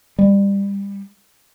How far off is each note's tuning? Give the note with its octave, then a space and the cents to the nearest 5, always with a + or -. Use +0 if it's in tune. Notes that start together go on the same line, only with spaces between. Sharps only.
G3 +25